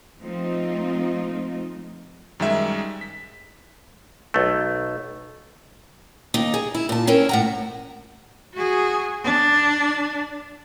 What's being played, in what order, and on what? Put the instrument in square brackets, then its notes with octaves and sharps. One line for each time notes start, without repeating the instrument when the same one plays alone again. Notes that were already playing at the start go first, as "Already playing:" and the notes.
[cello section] F3 A3 C4 D#4 F4
[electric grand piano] F#2 D#3 G3 G#3 E5
B6
[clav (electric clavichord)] B1 A3
[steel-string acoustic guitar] D#2 D#4
G#4
E4
A#2 A5
C4 C#4 E4 A#4
A2 F#5 A#5
[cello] F#4 G#4
D4